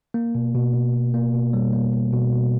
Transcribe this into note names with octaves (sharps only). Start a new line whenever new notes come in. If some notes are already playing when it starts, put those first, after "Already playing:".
A#3
B2
B2
B2
B2
A#3
B2
G3
A#3
A#3
B2
B2